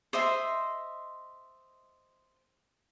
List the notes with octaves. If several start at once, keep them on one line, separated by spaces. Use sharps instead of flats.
C5 D#5 E5 C6